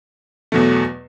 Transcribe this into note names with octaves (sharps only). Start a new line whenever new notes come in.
E2 B2 F#3 A3